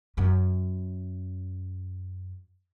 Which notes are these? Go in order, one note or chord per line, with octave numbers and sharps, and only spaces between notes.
F#2 C#4